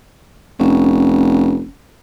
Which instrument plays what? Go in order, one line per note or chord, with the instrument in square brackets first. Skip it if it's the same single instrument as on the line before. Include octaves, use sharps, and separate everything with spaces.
[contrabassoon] F1 [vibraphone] C#4